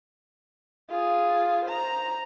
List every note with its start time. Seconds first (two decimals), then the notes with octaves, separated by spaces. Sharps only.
0.90 F4 G#4
1.64 C5 A#5